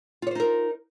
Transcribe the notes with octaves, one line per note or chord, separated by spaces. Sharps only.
D#4 F4 A#4 C5 C#5